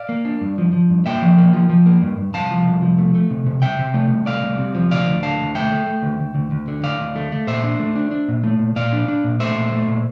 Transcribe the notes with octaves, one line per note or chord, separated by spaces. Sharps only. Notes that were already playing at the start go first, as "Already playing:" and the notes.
Already playing: D5 F5
A#3
D4
G2
F3
F3
G2
A#3 E5 G5
F3
A#3
F3
F3
A#3
G2
G2
C2 F5 A5
F3
C2
F3
A3
A3
C3
C3
C2 E5 G5
C3
A3
C2
A3 D5 F5
C2
C3
F3
D2 D5 F5
D2
D3 F5 A5
D2
A3 E5 G5
A3
A3
D2
D2
D2
D2
D3
D2 D5 F5
D2
A3
A3
A#2 C5 E5
D4
A3
D4
D4
A#2
A3
A#2
A#2 D5 F5
D4
D4
A#2
A3 C5 E5
A#2
A3
A#2